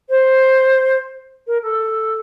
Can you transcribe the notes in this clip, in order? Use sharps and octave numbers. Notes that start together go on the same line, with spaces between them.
C5
A#4
A4